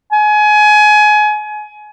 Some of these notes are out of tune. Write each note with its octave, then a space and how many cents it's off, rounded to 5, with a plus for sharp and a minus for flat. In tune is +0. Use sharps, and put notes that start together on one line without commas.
G#5 +25